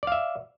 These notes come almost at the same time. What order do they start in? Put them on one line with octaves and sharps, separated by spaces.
D5 F5 E5